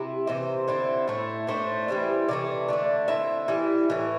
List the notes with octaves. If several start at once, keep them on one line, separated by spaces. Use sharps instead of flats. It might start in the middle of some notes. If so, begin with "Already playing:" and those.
Already playing: C3 E4
C3 E3 C5
D3 C4 E4
A2 A3 E4
A2 A3 D4 C5
E3 G3 C4 E4
C3 E3 A3 D5
D3 A3 D4
D3 C4 E4 E5
E3 G3 E4
A2 E3